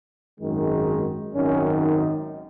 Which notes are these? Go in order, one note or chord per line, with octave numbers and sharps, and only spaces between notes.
G#1 F#2 D#3 G#3
G#1 F#2 D#3 C#4
D#4